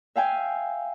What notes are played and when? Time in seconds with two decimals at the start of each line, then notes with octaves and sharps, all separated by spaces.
0.16 E5 F5 G5 G#5